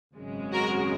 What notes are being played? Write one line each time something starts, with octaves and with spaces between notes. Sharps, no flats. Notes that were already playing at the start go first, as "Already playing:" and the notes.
G#1 F#2 C#3 G#3
F#4 A#4